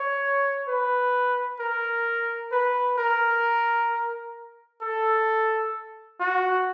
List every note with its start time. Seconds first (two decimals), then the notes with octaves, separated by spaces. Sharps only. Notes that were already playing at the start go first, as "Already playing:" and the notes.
Already playing: C#5
0.68 B4
1.60 A#4
2.52 B4
2.98 A#4
4.81 A4
6.20 F#4